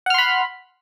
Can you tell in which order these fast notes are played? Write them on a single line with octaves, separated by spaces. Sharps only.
F#5 F6 C6 B5